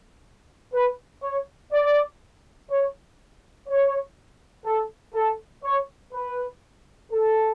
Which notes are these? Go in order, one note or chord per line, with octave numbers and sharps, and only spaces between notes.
B4
C#5
D5
C#5
C#5
A4
A4
C#5
B4
A4